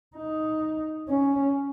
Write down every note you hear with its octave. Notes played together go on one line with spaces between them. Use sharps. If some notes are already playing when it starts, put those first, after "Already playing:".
D#4
C#4